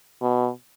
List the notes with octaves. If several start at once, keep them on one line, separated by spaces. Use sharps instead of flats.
B2